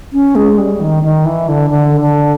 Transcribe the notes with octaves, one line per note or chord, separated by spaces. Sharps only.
C#4
G#3
G3
D#3
D#3
E3
D3
D3
D3